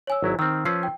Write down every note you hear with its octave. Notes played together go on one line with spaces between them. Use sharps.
C#5 G#5 E6
G#1 F#3 E4
D#3 C4 E6 F6
F3 C#4 B4 E6 C7
G5